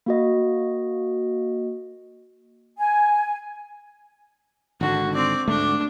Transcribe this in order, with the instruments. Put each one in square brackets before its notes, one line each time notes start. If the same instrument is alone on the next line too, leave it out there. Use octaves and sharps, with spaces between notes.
[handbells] A#3 F#4 D#5
[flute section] G#5
[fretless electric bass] G#1 D3 [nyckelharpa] F#4
[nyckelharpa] C4 D5
[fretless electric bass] D2 G#2 A3 [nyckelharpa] D4